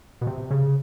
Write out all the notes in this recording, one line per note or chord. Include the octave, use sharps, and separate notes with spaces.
B2
C3
C#3